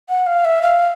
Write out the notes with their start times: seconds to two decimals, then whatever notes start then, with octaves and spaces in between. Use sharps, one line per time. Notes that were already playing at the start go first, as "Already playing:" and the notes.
0.09 F#5
0.27 F5
0.45 E5
0.62 F5